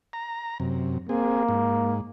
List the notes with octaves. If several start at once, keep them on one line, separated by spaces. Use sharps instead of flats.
A#5
F#2 C3
A#3 C4 G#4
G#2